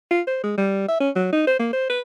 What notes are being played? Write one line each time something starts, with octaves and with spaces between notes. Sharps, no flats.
F4
C5
G#3
G3
E5
C#4
F#3
D#4
C5
A#3
C5
B4